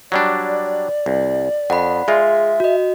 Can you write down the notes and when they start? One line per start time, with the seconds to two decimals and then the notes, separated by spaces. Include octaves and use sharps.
0.12 F#3 G3 D4 D5
1.06 C2
1.70 F2 F#5 B5
2.08 G#3 F4 G#4 E5
2.60 F#4 D#5